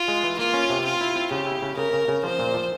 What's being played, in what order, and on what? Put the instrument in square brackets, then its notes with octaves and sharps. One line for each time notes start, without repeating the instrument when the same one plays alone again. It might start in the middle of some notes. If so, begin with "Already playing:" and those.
Already playing: [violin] F4
[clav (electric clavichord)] G#3
E3
[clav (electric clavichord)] A#3 [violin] F4
[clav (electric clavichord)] C#4
C3
[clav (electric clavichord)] C4 [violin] F4
[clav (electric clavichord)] E4
C4
[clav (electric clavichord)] C#3 [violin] G4
[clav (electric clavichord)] E4
C#3
[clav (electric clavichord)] C#3 [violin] A#4
[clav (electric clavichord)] C#3
C#3
[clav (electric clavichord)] F3 [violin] C5
[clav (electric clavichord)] A#2
F3